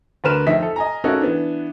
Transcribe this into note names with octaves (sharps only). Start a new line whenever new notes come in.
D2 D3 A#4 B4 F6 E7
F2 D#4 E5 B6
A4
D#5 G#5 A#5
A#3 C#4 D#4 F#4 A4
E3 B3 D4